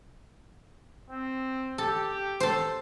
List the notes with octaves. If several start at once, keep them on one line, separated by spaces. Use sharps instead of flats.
C4
G4 A4
A4 C5